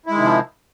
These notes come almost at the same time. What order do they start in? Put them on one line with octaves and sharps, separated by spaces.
E4 G#3 D#3 C3 F3